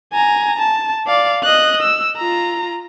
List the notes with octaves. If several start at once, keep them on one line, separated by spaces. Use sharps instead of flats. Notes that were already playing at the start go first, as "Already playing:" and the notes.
G#5 A#5
A5
D5 F5
D#5 F#6
E6
F4 A#5